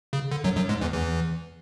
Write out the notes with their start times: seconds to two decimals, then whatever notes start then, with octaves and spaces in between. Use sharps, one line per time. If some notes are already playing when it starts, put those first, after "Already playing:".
0.13 C#3
0.32 D3
0.44 F#2 F#3
0.56 F#2 F#3
0.69 G#2 G#3
0.81 E2 E3
0.94 E2 E3